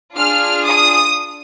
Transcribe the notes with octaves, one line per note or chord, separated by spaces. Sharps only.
D4 F4 G#4 F6
D#6